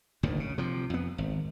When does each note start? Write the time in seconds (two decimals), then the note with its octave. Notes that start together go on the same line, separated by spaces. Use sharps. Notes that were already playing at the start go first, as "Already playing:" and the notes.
0.23 F#1 D2 A#2 D#3
0.40 C#3
0.58 C3 F3
0.90 F2 B3
1.18 G#1